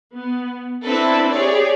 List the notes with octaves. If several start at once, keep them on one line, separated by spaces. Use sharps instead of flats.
B3
C4 D4 E4 A4 B4
G4 G#4 C#5 D5